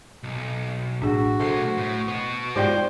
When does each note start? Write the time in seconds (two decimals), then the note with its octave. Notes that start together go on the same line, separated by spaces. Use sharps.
0.23 B1
1.02 A1 D4 F#4 G#4
1.40 B1 F#3 A3 C5 C7
1.77 A2
2.08 B3 F#4 C#6
2.56 G#2 F3 G4 C5 D5 G5